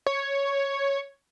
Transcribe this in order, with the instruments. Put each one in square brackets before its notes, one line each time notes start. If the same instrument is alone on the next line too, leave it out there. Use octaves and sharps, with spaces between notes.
[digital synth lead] C#5